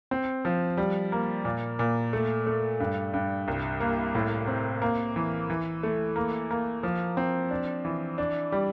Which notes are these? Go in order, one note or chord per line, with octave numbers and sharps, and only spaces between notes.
C4
F3
G3
A#3
A#2
A#2
A3
A3
G2
G2
C2
A#3
A2
C4
A#3
E3
E3
A3
A#3
A#3
F3
C4
D4
E3
D4
G3